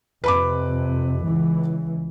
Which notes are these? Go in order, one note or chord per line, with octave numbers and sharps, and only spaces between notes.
F2 C3 B4 B5 D6
C#2 E3